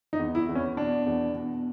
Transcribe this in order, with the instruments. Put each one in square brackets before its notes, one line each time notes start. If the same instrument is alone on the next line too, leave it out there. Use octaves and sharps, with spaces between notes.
[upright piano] D#4
E2
E4
E2
C#4
B2 D4
E2
B2